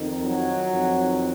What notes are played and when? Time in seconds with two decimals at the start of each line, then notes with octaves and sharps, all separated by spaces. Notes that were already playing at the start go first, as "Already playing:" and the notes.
Already playing: F2 D#3
0.21 F#3
0.69 F2 D#3